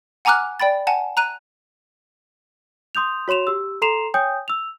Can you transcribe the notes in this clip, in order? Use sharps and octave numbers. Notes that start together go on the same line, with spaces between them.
F#5 G#5 A#5 D6 F6 F#6
D5 G5 B5 A6
F#5 G#5 A5
A#5 F#6 D#7
C6 D#6 G6 F7
F#4 C#5 C6 E7 F7
G4 E6
A4 A#5 C6 C7 E7 F7
C#5 G5 G#5 D#6 G6
E6 F7